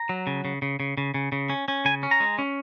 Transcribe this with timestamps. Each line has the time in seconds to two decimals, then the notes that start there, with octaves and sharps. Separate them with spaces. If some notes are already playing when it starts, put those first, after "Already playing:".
Already playing: A#5
0.09 F#3
0.27 C#3
0.45 C#3
0.62 C#3
0.80 C#3
0.97 C#3
1.14 C#3
1.32 C#3
1.50 C#4
1.68 C#4
1.85 C#3 G#5
2.03 C#4
2.11 A#5
2.20 G#3
2.39 C#4